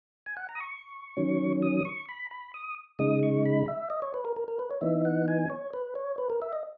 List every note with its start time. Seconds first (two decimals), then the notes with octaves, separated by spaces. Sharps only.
0.26 G#5
0.37 F#5
0.49 A#5
0.55 D#6
0.60 C#6
1.17 D#3 F#3 C#4
1.62 D#6
1.85 C#6
2.09 B5
2.31 B5
2.54 D#6
2.99 C#3 G#3 D#4 D#6
3.23 C#6
3.46 B5
3.68 E5
3.90 D#5
4.02 C#5
4.14 B4
4.25 A#4
4.36 A#4
4.48 A#4
4.59 B4
4.71 C#5
4.81 E3 B3 D#4 E5
5.05 F#5
5.28 G#5
5.50 C#5
5.73 B4
5.95 C#5
6.18 B4
6.30 A#4
6.42 E5
6.53 D#5